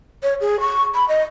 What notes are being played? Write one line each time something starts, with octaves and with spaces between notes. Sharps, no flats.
C#5
G#4
C#6
B5
D#5